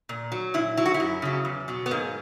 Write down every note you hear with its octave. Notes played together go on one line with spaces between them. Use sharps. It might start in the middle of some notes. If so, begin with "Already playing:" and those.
A#2
F#3
A#2 E4
F#3 E4
F#4
E4
F#2
C#3 F#3
E2
B2 F#3
B3
G#2 A#3